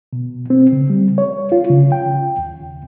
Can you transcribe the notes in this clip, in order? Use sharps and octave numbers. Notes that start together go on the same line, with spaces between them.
B2
C4
C#3
G3
C#5
F4
C#3
G5
D#2